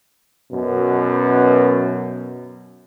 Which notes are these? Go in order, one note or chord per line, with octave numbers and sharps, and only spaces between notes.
F#2 B2